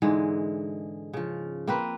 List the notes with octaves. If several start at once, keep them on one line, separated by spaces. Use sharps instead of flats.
G#2 D3 E3 G#3
C#3 F3
A#3 C4 B4